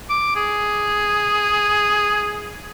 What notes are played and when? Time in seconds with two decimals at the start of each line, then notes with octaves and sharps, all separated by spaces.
0.10 D6
0.36 G#4